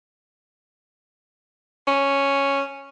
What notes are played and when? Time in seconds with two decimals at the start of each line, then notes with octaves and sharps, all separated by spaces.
1.87 C#4